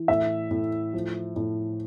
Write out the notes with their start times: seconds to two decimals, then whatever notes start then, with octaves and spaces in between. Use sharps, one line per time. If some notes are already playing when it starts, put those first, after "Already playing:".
Already playing: E3
0.08 A2 E5
0.51 A2
0.94 F3
1.36 A2